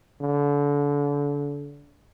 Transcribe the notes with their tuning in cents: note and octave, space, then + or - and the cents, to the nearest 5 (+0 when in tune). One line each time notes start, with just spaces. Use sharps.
D3 -30